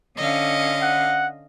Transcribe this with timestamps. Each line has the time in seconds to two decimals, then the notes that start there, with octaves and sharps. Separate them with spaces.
0.18 D3 C#4 D#5 F5
0.82 F#5